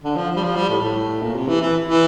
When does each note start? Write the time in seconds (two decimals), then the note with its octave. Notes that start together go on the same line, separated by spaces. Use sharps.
0.04 D3
0.16 F3
0.36 G3
0.44 F3
0.56 G3
0.70 A2
0.82 A2
1.22 A#2
1.35 C3
1.48 E3
1.61 E3
1.88 E3